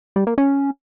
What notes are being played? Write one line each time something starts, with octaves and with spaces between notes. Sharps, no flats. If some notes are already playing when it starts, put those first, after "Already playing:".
G3
A#3
C#4